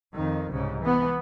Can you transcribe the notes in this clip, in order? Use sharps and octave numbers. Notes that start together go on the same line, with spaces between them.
F2 D#3
C2 G#2 C#3
E3 B3